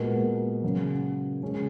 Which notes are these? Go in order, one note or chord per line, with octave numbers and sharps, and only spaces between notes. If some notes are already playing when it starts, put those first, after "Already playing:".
Already playing: A#2 G#3 B3 F#4 A#4
C#3 F#3 C#4 F#4
C#3 G#3 C#4 G#4